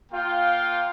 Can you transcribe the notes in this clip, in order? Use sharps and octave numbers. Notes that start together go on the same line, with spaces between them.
A#3 F4 F5 G5